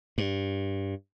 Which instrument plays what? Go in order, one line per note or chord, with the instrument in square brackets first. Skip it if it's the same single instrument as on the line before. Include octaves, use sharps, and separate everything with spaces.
[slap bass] G2